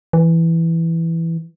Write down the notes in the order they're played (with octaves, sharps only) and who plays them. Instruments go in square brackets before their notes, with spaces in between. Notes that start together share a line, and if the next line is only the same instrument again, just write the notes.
[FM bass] E3